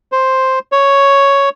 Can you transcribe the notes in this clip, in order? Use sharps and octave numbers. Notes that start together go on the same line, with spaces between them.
C5
C#5